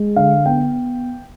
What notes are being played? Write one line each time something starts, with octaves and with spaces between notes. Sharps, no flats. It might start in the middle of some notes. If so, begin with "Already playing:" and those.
Already playing: G#3
D3 F5
B3 G5